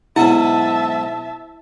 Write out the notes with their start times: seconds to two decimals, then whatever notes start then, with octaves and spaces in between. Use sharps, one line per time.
0.16 B1 G#2 E4 E5 F#5 A5